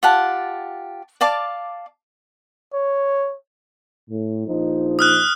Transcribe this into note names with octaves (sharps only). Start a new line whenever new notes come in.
F4 G4 F#5 A5
D5 F5 A5 D6
C#5
A2
A#1 F3 D#4
D#6 F6 F#6